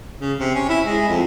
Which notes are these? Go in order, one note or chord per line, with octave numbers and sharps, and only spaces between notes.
C#3
C3
C#4
E4
G#3
F2